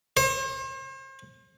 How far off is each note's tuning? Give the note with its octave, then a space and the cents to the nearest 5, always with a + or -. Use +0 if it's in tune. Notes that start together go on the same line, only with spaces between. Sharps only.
C5 +40